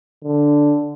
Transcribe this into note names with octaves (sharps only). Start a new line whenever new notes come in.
D3